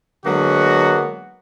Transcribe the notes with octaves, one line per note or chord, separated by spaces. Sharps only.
D3 F#3 G#3 A#3 B3 F#4